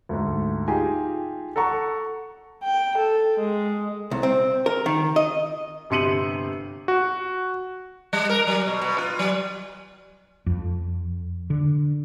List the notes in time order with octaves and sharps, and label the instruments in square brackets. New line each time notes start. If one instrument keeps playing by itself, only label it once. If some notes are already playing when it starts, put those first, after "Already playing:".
[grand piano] D2 G#2
D#4 F4 G4 G#4 G#5
A4 F#5 A#5 C#6
[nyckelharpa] G5
A4
G#3
[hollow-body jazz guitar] C2
C4
A#4
D#3
D#5
[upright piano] G1 C3 C6 C#7 D#7 F#7
[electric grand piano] F#4
[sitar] G3
A#4
F#3
B2
B2
F4
F#3
[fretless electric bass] F2
D3